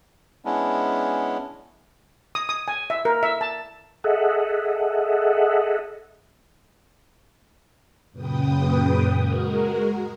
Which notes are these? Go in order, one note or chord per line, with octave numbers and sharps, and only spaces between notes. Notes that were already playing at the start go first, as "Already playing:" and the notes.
G#3 B3 C#4 D4 E4
D#6
D#6
G#5
E5
A#4
E5
A5
G#4 A4 D#5 E5 F#5
F#2 A#2 C#3 B4 G5 D#6
G#3 F#4 A#4